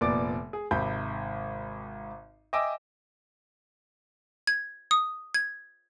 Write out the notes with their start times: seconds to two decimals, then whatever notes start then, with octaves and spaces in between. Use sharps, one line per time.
0.01 F1 A#2 B3 D5 D6
0.53 G#4
0.71 G#1 C3 B5 G6
2.53 D#5 E5 G5 G#5 D6 E6
4.47 G#6
4.91 D#6
5.34 G#6